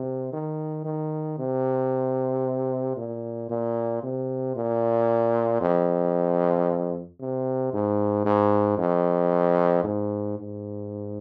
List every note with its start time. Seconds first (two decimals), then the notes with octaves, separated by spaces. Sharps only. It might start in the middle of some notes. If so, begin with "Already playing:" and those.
Already playing: C3
0.33 D#3
0.85 D#3
1.38 C3
2.97 A#2
3.49 A#2
4.03 C3
4.56 A#2
5.61 F2
7.20 C3
7.73 G#2
8.25 G#2
8.78 F2
9.84 G#2
10.38 G#2